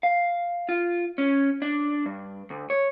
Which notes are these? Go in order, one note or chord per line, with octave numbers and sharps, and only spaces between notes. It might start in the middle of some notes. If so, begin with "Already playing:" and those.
F5
F4
C#4
D4
G2
D2
C#5